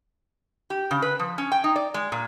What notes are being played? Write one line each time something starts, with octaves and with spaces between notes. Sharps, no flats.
G4
C#3
B4
F3
C#4
G5
D#4
D5
G#3
A#2